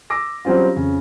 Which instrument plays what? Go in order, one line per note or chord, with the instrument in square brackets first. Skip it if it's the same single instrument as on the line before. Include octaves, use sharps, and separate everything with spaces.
[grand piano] D6 E6 A#6
F#3 G3 C4 C#4 F4
F2 C#3